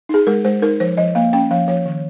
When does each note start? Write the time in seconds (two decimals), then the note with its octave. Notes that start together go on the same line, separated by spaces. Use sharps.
0.09 D#4 G#4
0.27 G#3 A#4
0.45 G#3 C5
0.62 D#4 A#4
0.80 F3 C5
0.97 F3 D#5
1.15 A#3 F5
1.33 C#4 G5
1.51 F3 F5
1.68 F3 C#5
1.86 D#3